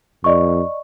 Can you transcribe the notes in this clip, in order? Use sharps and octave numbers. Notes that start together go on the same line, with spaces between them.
F2 D5 D#5 C#6